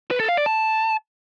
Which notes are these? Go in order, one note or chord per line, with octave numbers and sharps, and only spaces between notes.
B4
A4
F5
D5
A5